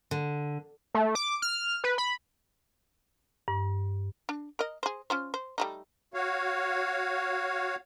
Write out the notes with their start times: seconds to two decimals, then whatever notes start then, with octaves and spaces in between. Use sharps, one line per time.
0.11 D3
0.94 A3
1.15 D6
1.42 F6
1.84 B4
1.98 B5
3.48 G2
4.29 D4
4.59 A#4 D#5
4.83 G#4 C5
5.10 C#4 F4 C5
5.34 C5
5.58 G3 A3 D#4
6.14 F#4 C#5 F5